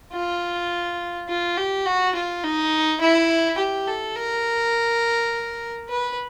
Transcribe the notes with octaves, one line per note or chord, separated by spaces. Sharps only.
F4
F4
G4
F#4
F4
D#4
E4
G4
A4
A#4
B4